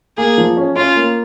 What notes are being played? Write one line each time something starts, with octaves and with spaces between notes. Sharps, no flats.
A#3 G#4
F3
C#4
C#4 F4
A#3